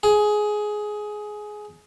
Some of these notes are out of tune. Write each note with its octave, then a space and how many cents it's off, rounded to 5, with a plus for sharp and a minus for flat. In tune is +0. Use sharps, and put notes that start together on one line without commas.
G#4 +15